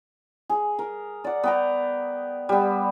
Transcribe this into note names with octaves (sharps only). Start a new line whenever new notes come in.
G#4
A#4
D5 F#5
B3 G5 A#5
G3 B3